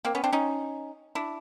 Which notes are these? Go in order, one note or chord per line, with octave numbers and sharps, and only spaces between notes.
A#3 C4
B3 C#4
C4 D4
C#4 D#4
D4 E4